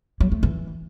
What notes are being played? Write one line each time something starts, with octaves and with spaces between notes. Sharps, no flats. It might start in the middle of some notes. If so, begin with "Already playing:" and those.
F#3
A3
E3